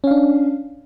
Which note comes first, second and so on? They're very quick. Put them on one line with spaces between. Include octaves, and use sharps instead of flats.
C#4 F5 D4